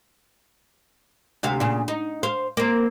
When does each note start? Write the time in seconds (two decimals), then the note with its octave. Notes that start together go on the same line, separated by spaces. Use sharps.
1.43 D2 C3 F5
1.60 A#2 C#3
1.88 D#4
2.23 C5 F5
2.57 A#3 C4